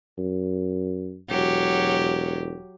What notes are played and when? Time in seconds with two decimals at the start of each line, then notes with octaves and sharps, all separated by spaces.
0.18 F#2
1.30 E1 F#3 G4